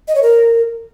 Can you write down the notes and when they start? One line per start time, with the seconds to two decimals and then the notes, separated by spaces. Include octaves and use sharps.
0.08 D#5
0.15 C#5
0.22 A#4